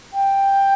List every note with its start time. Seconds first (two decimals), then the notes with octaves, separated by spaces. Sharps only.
0.13 G5